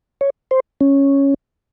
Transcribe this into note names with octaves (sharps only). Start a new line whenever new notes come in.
C#5
C5
C#4